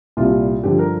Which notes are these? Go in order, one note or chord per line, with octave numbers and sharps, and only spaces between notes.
C2 A#2 G3 F4
G2 D3 F3 G4
A#4